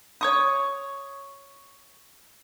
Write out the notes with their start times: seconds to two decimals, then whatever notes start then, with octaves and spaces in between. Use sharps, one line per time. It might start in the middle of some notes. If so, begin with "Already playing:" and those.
0.21 C#5 C#6 D#6